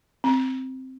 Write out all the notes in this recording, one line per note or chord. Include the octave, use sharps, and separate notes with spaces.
C4